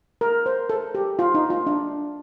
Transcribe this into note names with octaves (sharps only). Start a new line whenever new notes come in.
A#4
C5
A4
G4
F4
D#4
F4
D4